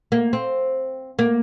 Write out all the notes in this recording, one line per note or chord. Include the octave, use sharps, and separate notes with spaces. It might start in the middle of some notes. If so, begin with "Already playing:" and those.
A#3
C4
A#3